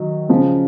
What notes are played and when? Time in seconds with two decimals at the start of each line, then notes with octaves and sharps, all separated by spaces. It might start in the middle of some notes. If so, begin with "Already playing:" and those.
Already playing: D#3 F#3
0.29 C#3 F3